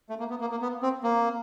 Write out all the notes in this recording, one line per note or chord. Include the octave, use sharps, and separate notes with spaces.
A3
A#3
B3
A#3
A#3
B3
C4
A#3